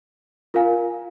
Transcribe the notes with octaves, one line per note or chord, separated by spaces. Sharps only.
F4 A#4 F5 G#5